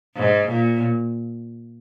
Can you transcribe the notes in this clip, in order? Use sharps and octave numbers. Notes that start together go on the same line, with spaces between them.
G#2
A#2